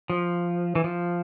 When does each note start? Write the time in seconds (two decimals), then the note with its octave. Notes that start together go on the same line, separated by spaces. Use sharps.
0.10 F3
0.75 E3
0.84 F3